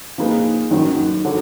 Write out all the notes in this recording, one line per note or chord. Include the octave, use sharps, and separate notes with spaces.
F3 A#3 D#4 G#4 B4
F#2 D#3 F#3
D3 F#3